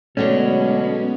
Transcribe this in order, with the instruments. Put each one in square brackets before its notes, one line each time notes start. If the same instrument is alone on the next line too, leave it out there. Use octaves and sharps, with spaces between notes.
[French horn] B2 [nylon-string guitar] D3 F#3 A3 [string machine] G#3 B3 [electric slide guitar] C#4